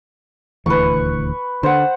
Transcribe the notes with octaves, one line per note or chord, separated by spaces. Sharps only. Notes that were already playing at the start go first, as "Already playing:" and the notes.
D#1 D2 E3 B4 C#6
D3 C5 F#5